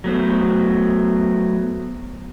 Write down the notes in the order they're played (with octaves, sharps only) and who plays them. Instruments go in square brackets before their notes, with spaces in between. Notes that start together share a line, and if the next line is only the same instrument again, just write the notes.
[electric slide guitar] F#3 A3 B3 C5